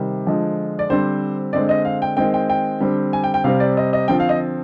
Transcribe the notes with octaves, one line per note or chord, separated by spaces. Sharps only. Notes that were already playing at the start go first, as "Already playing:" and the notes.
Already playing: C3 D#3 G3 C5
D3 F3 G#3
D5
D3 G3 C4 C5
D3 G#3 C4 D5
D#5
F5
G5
D#3 G#3 C4 G5
G5
G5
D3 G3 C4
G#5
G5
G5
C3 G3 C4 F5
D5
D#5
D#5
D3 F3 C4 G5
F5
D#5